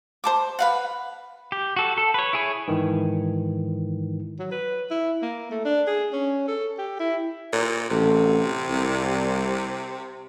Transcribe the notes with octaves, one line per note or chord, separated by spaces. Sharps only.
C5 A5 D6
B4 F5 F#5
G4
F#4 A4
A4
B4 C#5
E4 G#4 C#5
G#2 D#3 E3
F#3
B4
E4
A#3
A3
D4
G#4
C#4
A4
G4
E4
A#2
A1 C3 F#4 A4
C2